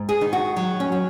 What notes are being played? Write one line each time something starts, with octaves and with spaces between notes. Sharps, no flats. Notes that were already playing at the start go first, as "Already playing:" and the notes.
Already playing: G#2
G#4
D#3 D#4
F#4
F#3
C#4
F#3